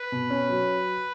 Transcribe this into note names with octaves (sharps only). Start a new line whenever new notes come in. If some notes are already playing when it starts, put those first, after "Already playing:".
Already playing: B4
B2
C#4
F#3